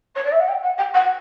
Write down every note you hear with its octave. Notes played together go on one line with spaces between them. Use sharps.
C#5
D5
E5
F#5
G5
F#5
G5
F#5